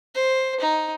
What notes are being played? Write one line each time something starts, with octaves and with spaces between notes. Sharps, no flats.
C5
D#4